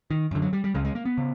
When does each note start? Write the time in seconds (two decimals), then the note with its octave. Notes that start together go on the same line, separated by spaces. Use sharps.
0.11 D#3
0.31 F#2 D3
0.42 F#3
0.53 G3
0.64 G3
0.74 C#2 C#3 G#3
0.85 G#3
0.95 A#3
1.05 B3
1.18 C#3